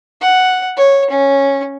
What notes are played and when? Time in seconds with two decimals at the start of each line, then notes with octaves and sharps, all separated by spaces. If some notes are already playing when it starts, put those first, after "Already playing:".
0.21 F#5
0.77 C#5
1.11 C#4